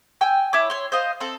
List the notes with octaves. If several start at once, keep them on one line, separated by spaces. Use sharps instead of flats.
G5 G#5 E6
E4 C#5 D6
C#5 C6
C5 D#5 F5
C4 A4